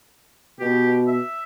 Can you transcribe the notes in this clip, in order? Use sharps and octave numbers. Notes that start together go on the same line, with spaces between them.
B2 G4
E5